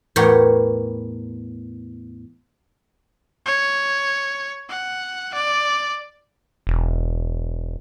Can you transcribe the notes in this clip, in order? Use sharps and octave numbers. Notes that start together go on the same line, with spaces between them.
E2 A2 B3 G4 A#4 C#5
C#5
F#5
D5
E1